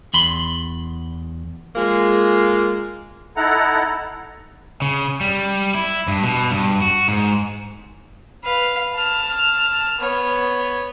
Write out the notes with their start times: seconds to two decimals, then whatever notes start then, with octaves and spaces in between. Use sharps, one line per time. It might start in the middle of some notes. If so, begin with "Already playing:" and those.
0.14 E2 B5 C6
1.76 G#3 A#3 F4
3.37 D#4 E4 A4 F#5 A#5
4.82 C#3
5.21 G3
5.75 E4
6.08 G2
6.23 B2
6.51 G2
6.82 F#4
7.08 G#2
8.43 B4 F5
8.95 A5 F6
9.98 B3 C#5